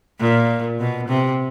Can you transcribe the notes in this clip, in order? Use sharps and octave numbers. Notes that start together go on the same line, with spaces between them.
A#2
B2
C3